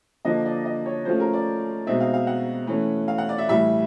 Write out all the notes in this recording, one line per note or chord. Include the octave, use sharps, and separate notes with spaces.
D3 F3 A#3 D#5
D5
D#5
C#5
F3 A3 C#4 F4 C5
A#4
D5
B2 G#3 C4 D#4 E5
F5
F5
F#5
E3 A3 C#4
F5
F#5
D5
E5
A2 E3 G3 E5